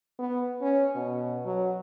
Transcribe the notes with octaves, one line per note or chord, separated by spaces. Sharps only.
B3
C#4
B2
F#3